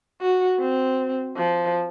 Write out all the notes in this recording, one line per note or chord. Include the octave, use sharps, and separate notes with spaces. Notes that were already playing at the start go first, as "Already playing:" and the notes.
F#4
C4
F3